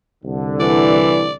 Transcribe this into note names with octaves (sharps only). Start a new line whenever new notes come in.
C2 D3
E3 D5